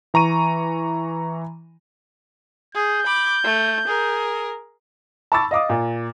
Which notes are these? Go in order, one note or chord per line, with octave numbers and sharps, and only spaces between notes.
E3 A#5 C#6 D#7
G#4 G6
B5 D6
A3
G#4 A#4
A5 B5 C#6 D6 E6 A6
D#5 F5 D6 D#6
A#2